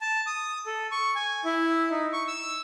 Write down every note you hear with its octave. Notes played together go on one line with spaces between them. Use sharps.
A5
D#6
A4
C#6
G#5
E4
D#4
C#6
E6